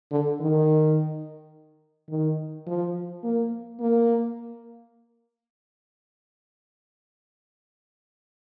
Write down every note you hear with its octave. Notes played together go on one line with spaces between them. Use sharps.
D3
D#3
D#3
F3
A#3
A#3